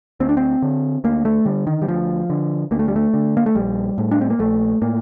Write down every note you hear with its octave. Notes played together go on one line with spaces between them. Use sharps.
D2 C4
D4
C4
D3
D2 A#3
A3
D3 G3
D#3
G3
D2 F3
D3
D2 A#3
A3
G3
A3
D3
A#3
A3
A#1 G3
A2
D4
C4
A#3
A#1 A3
A2 A#3